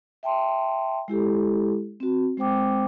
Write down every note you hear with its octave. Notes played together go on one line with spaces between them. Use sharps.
E5 G5 A5 C6
G#3 E4 G4 A4
C4 F#4
G#3 C4 C5 G5 D6